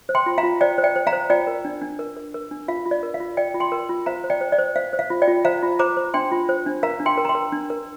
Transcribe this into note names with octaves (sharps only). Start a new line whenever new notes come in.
C5
G5 C6
F4
F5 A#5
F4
C5 D5 G5
C5
D5 G5
C5
F5 A#5
C5
F4 D5 G5
A#4
D4
D4
A#4
A#4
A#4
D4
F4 F5
F4
D5
A#4
F5
F4
F4 D5 G5
F4
G5 C6
A#4
F4
C5 F5 A#5
C5
D5 G5
C5
D5
C5
C5 F5
C5
F5
F4
D5 G5
F4
C5 F5 A#5
F4
C5 A#5 D6
C5
D4 G5 C6
F4
C5
D4
A#4 F5 A#5
D4
G5 C6
A#4
A#5
G5 C6
A#4
D4
A#4